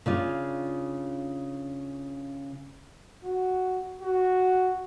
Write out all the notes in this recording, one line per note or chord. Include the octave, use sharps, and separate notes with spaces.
C#3 D4 F4
F#4
F#4